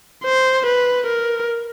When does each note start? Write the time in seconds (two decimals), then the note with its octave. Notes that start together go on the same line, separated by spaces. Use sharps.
0.24 C5
0.66 B4
1.07 A#4